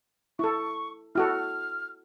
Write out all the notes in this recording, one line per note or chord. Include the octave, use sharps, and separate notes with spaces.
E4 A4 C#6
E4 F#4 A4 F6